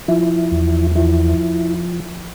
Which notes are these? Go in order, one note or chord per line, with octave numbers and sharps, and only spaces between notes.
F3 E4
E2
F3 E4